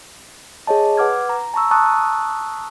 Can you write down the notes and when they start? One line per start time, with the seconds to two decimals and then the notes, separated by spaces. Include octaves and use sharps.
0.67 G#4 C#5 D#5 A5
0.97 B4 F#5 D6 F6 G#6
1.29 A#5
1.54 A5 A#5 C#6 E6
1.71 A5 A#5 C#6 D#6 E6 F#6